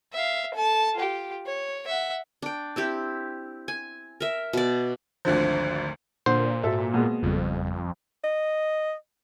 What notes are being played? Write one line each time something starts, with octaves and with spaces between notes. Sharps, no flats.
E5 F5
A4 A5
F4 G4
C#5
E5 F#5
D4 G5
C4 E4 G4
G#5
A#4 E5
B2 D5
G#1 D2 D3 F3
A#2 D3 C5
G#2 F#4 A4 E5
B2 G#3 A#3
G#1 F2 C#3 G3
D#5